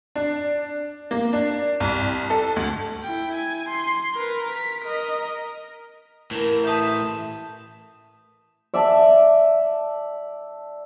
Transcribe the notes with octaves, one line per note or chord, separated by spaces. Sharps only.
D4
A#3
D4
C2
A4
D2
E4 G5
G#5
C6
A#4 B4
B6
A#4 D#5
A2 E3 A#4
E5 A5 D#6 G6
D5 E5 F#5 A5